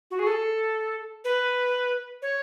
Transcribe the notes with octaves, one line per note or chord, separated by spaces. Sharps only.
F#4
G#4
A4
B4
C#5